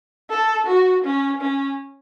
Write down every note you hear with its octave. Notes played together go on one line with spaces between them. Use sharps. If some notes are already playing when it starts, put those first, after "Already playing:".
A4
F#4
C#4
C#4